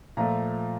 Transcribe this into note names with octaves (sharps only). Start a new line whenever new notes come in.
A#2 F3 A3 A#5